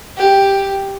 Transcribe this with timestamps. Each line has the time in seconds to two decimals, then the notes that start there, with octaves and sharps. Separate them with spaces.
0.17 G4